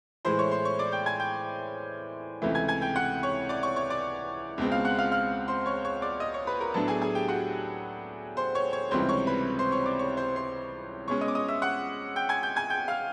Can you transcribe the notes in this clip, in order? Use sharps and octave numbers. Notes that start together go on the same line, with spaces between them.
A2 E3 G#3 C5 C6
C#5 C#6
C5 C6
C#5 C#6
D5 D6
G5 G6
G#5 G#6
G5 G6
C#2 C3 E3 A3
G#5 G#6
G#5 G#6
G5 G6
F#5 F#6
C#5 C#6
D5 D6
C#5 C#6
C#5 C#6
D5 D6
C#2 B2 G#3 C4
F5 F6
F#5 F#6
F5 F6
F5 F6
C5 C6
C#5 C#6
C#5 C#6
D5 D6
D#5 D#6
C#5 C#6
B4 B5
A#4 A#5
A2 F#3 B3 D4 A4 A5
G#4 G#5
G#4 G#5
G4 G5
F#4 F#5
C5 C6
C#5 C#6
C#5 C#6
C#2 C3 E3 G3 C5 C6
C#5 C#6
B4 B5
C5 C6
C#5 C#6
D5 D6
C#5 C#6
C5 C6
C5 C6
B2 G#3 C#4 C#5 C#6
D#5 D#6
D6
D#5 D#6
E5 E6
F#5 F#6
G5 G6
G#5 G#6
G5 G6
G#5 G#6
G5 G6
F5 F6